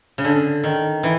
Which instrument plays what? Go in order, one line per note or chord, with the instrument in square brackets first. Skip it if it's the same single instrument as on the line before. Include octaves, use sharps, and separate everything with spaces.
[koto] C#3
D3
D#3
E3